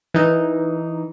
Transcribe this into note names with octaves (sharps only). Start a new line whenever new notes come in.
E3 D#4